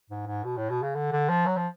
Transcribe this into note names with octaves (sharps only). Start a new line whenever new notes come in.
G#2
G#2
B2
A2
B2
C#3
D3
D3
F3
F#3
F3